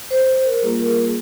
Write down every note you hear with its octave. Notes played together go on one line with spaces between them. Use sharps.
C5
C5
A#4
G3 A#3 F4 G#4
A#4
G#4